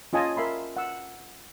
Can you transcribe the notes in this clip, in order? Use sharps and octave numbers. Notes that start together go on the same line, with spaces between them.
C#4 F4 D#5 G#5 A5
A#4 E5 B5 C6
F#5 E6